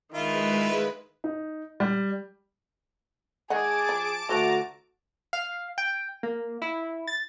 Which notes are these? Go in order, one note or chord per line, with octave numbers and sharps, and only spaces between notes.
D#3 G#3 E4 F4 B4
D#4
G3
D#3 G#3 G#4 F#5 A5 D6 D7
F3
D2 E3 A3 F#4 C5 A#5
F5
G5
A#3
E4
A6